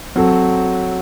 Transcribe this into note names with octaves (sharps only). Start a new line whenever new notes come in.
F#3 C4 F#4 A4